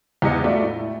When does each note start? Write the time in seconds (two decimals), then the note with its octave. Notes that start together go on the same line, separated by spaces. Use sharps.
0.22 E2 G4 D#5 C#7
0.44 A3 F4 F#4 D5
0.63 A2